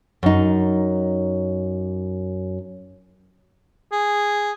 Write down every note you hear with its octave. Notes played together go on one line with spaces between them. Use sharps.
F#2 D#4
G#4